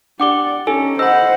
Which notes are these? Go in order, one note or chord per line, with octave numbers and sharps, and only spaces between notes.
D4 G4 D5 F#5 D6 G7
C#4 D#4 G4 A4 G#5
C5 D#5 F#5 B5 E6